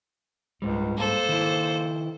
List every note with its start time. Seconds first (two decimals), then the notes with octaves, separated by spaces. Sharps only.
0.62 C#2 G#2 G3
0.98 A#3 A4 C5
1.29 D#3 E4